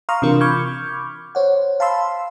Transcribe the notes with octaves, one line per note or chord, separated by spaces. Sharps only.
F5 A#5 C6 C#6 D#6 F6
C3 E3 D4 F4 A#4
B5 C#6 D6 F6 G6 G#6
C5 C#5 F#5
F5 A5 B5 C6 E6